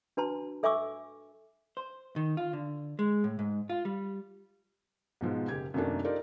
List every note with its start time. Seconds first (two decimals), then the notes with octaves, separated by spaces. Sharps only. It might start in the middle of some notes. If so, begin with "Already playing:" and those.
0.17 D4 F#4 B4 A5 A#5 C6
0.63 A4 E5 G#5 C#6 D6 E6
1.77 C5
2.16 D#3
2.37 F4
2.53 D3
2.99 G#3
3.24 A2
3.39 G#2
3.70 F4
3.85 G3
5.21 G#2 B2 F3 G#3
5.48 F#1 G4 G#6
5.74 F#2 C3 D#3 A3 A#3 D4
6.04 D#4 F4 G4 A4 A#4 D5